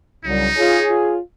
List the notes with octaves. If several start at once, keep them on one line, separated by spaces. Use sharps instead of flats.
C2 C#3 F#3 D#4
F4 G#4 C#5
F4